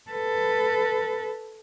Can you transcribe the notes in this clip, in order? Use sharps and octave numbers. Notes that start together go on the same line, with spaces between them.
A4 B4